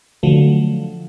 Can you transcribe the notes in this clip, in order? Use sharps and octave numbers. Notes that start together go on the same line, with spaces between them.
D3 F3 F#3 A3